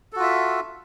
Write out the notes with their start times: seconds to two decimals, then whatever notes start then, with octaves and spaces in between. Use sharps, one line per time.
0.13 A4
0.16 F#4
0.19 F4
0.23 E5